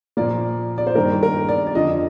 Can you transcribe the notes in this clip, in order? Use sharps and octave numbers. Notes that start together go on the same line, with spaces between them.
A#2 F3 A#3 D5
D5
C5
G2 D#3 A#3 A#4
A#4
D5
D5
F2 D3 F3 D#5